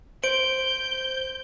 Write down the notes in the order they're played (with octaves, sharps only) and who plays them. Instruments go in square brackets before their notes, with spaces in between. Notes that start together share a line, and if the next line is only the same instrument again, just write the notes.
[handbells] C5 [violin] G6 [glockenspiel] D7